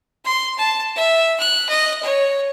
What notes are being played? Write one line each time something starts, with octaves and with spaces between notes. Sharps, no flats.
C6
A5
E5
F#6
D#5
C#5